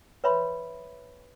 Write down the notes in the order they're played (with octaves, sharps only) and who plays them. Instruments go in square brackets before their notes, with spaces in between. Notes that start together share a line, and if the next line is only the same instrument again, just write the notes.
[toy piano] B4 C#5 E5 B5 C6